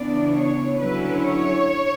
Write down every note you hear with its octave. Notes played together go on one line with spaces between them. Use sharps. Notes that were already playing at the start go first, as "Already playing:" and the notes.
Already playing: C#3 E3 B3 D4 D5
C#5
D3 F#3 C#4 E4 B4
C#5